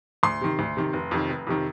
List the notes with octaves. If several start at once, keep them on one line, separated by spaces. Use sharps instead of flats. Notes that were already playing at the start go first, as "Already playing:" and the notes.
D2 C6
C3 D#3
D2
C3 D#3
F1
F2 C3 D#3
F1
F2 C3 D#3